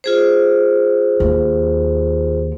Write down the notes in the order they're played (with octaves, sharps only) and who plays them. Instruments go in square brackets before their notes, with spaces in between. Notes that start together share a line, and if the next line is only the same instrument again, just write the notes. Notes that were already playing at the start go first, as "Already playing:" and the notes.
[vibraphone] F4 G#4 C5
[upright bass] D#2